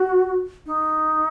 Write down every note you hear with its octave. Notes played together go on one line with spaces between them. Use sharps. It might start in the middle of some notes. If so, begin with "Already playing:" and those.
Already playing: F#4
D#4